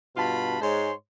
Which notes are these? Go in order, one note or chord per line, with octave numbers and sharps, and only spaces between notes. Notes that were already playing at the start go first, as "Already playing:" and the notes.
G2 B2 F4 A5 B5
G#2 G#3 C5 C#5 C6